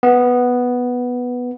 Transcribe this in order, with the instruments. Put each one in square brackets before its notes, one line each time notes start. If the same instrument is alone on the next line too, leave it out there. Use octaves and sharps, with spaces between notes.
[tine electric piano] B3